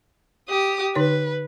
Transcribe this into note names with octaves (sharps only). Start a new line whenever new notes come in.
G4 D#6
D3 D#4 B4 C#5